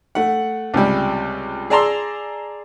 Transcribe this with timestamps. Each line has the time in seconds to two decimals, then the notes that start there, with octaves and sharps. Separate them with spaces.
0.15 A3 F#5
0.74 C#2 C3 G3
1.70 G#4 D5 A5 A#5 C6 E6